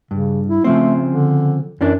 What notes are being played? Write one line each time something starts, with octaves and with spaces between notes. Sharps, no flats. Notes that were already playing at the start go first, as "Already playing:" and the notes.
G2 C#3
E4
C#3 F3 A3 C4
D3
F#2 E3 C#4 D4